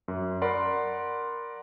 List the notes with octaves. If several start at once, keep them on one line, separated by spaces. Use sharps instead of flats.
F#2
A#4 D5 F#5 B5 C6